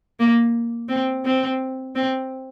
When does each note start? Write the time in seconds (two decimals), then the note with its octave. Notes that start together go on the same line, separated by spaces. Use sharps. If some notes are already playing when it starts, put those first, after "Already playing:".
0.20 A#3
0.89 C4
1.25 C4
1.95 C4